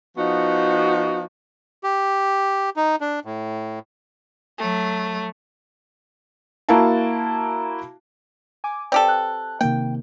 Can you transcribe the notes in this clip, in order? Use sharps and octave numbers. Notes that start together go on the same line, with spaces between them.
F3 B3 D#4 F#4
G4
D#4
D4
A2
F#3 A3
A#3 E4 F#4 F5 A5
G#5 D6
C4 G4 A4 B4 D5
F#6
C3 D#3 A#3 G5